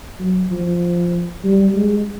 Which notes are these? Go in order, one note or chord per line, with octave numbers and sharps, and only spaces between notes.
F#3
F3
G3
G#3